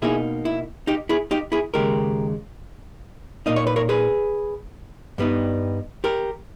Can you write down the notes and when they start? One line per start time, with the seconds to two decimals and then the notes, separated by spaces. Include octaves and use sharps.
0.02 B2 A#3 D#4 E4 G#4
0.45 E4
0.87 D#4 G4
1.09 E4 G#4
1.31 D#4 G4
1.52 E4 G#4
1.74 D#2 C#3 G#3 G4 A#4
3.46 A#2 A#3 D#4 D#5
3.56 C#5
3.67 B4
3.76 A#4 C#5
3.89 G#4 B4
5.18 G2 G3 B3 D#4
6.04 G4 A#4